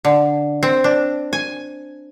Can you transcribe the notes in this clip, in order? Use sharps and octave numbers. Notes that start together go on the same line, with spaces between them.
D3
C4
D4
G#5